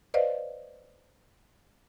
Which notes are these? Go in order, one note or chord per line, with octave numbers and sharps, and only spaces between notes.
B4 C5 D5 D#5 F5